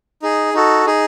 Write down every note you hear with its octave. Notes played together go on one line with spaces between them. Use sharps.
D#4 G#4
D#4 F#4 A4
D#4 G#4